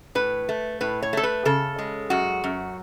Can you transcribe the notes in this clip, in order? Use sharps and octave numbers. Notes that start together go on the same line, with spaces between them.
A2 B4
A3
A2 B4
C#5
A3 A4
B4
C#3 A4
G#3
F#2 F#4
F#2